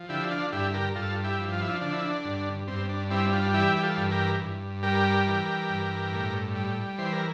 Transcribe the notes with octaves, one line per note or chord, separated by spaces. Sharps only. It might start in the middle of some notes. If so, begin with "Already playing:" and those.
Already playing: F3
D3 E4 G4
D4 F4
G2 E4 G4
G4 A#4
G2 F4 A4
E4 G4
F3
F4
E4
D4 F4
D3 D4
E4
D4
G2
G2 C4
D4
G3 C4 E4
D4 F4
E3 E4 G4
G4
F4 A4
G2
G4 A#4
G2
G3 G4 A#4
E3
G2
A2
G3
E3 C5
A#4